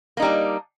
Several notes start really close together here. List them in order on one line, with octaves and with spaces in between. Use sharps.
A#3 D#4 G3 D4